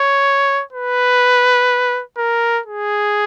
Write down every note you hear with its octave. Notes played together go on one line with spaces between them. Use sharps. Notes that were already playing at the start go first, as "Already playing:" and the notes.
Already playing: C#5
B4
A#4
G#4